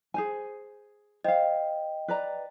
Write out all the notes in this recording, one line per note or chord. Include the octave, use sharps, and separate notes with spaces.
G#4 C5 G#5
C5 D#5 F5 G5
B4 D5 A#5